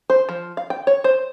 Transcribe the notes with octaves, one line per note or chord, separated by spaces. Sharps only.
C5
F3
F5
G5
C#5
C5